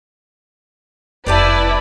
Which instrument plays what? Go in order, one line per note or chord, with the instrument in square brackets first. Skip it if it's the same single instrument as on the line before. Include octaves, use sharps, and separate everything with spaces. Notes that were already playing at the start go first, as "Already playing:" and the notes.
[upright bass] F1 [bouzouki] B3 G4 A5 [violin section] E4 B4 D5